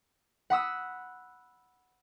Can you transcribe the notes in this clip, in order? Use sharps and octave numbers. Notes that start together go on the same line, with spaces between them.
F#5 B5 D#6 E6